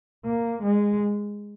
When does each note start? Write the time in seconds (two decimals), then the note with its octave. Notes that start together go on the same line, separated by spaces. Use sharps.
0.25 A#3
0.63 G#3